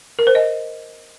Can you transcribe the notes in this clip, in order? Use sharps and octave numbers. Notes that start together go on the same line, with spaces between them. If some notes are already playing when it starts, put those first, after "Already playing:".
A#4
C5
D#5